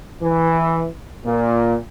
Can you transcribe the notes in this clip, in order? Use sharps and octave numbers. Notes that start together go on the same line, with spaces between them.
E3
A#2